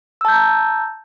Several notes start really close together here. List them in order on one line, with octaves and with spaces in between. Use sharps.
E6 A5 G6 A#5